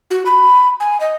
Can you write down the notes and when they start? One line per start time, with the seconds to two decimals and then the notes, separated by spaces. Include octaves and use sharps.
0.11 F#4
0.26 B5
0.80 G#5
1.00 D#5